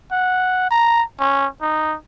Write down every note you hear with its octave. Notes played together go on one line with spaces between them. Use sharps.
F#5
A#5
C#4
D#4